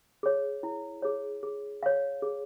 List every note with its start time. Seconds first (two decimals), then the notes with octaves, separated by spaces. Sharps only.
0.23 G#4 C#5
0.63 E4
1.02 G#4 C#5
1.43 G#4
1.83 C#5 F5
2.22 G#4